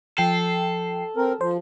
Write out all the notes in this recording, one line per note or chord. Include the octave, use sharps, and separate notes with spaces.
F3 A4 G5 C7
C4 A#4
F3 C5